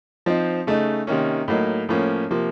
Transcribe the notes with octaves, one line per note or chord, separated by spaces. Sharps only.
F3 C4 D#4
C#3 A3 D#4
C3 D#3 A#3 C#4
A2 F#3 A#3 D#4
A2 F3 A#3 C#4
C3 F3 A#3